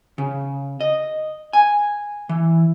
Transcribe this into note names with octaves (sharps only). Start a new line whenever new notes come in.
C#3
D#5
G#5
E3